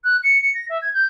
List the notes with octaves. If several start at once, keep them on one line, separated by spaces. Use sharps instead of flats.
F#6
C#7
C#7
A#6
E5
G#6
G6